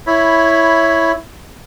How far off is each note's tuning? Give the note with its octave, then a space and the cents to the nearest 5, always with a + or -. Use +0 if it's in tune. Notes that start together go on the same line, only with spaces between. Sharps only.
E4 +0 C#5 +0 B5 +0